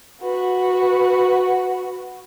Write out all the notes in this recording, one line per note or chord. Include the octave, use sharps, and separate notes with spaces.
F#4 B4